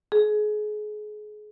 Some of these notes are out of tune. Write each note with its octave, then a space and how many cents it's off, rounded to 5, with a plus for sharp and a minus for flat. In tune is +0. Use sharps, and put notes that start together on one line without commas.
G#4 +30